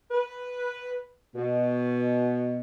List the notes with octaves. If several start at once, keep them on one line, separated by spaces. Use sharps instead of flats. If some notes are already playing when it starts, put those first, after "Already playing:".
B4
B2